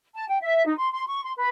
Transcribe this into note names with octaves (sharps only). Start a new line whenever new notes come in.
A5
G5
E5
D#4
C6
C6
C#6
C6
B4